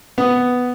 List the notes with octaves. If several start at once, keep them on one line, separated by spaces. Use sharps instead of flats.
B3